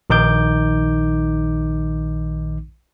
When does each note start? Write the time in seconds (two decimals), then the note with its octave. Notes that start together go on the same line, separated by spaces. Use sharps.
0.10 A#1 D#3 D#4 D6 G6